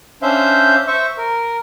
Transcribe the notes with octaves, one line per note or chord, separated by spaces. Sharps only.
C#4 D4 C5 E5 F5 G6
C5 E5 C#6
A#4